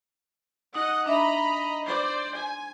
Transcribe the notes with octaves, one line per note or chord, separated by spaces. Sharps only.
D#4 D#5 F#5 D#6
D4 D#5 E5 A#5 B5
C5 D5
G#5